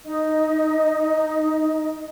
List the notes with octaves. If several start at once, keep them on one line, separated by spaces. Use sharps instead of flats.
D#4 D#5